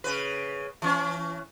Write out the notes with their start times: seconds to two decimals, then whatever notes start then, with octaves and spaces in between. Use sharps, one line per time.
0.04 C#3 B4
0.82 E3 C#4